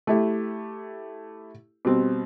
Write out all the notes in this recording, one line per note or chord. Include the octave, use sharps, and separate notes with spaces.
A3 E4 G4
B2 G3 C4